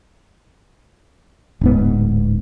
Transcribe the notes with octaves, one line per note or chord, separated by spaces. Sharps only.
D1 G#2 B3